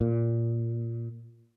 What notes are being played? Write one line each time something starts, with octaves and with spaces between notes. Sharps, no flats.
A#2